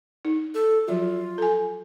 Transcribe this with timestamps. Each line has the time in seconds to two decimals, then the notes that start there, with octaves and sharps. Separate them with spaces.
0.25 D#4
0.55 A4
0.88 F3 F#3 F4 F#4
1.38 A4 G#5